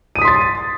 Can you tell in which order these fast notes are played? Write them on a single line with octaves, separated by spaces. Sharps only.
D#7 D#6 B6 C6 A6